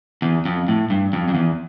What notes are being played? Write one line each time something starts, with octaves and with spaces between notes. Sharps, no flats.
E2
F2
A2
G2
F2
F2
E2